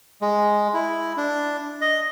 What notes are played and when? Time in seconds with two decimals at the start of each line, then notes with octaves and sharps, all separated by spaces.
0.21 G#3
0.74 E4
1.17 D4
1.81 D#5